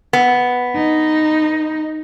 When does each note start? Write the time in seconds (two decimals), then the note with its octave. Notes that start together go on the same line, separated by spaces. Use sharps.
0.13 B3
0.76 D#4